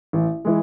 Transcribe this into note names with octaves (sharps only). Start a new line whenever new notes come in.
A1
E3 G#3